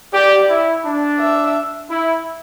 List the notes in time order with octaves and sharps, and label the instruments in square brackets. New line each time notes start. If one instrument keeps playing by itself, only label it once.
[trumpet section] G4 [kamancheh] D5
[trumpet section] E4
D4
[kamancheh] E5
[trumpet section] E4